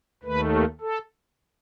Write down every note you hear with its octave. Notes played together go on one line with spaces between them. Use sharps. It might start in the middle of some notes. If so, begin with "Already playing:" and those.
D#2 D#3 A3 B4
A4